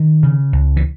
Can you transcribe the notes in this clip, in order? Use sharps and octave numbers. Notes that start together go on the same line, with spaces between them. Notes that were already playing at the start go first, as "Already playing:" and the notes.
Already playing: D#3
C#3
C#2
E3